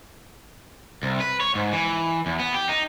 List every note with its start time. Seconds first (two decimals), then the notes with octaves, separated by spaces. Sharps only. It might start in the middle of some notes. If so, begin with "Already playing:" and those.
1.03 C2
1.20 B4
1.40 C#5
1.55 G#2
1.73 E3
2.26 E2
2.40 B3
2.54 G4
2.69 D#4